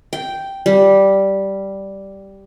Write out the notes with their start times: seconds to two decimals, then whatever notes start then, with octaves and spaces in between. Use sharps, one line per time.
0.13 G5
0.66 G3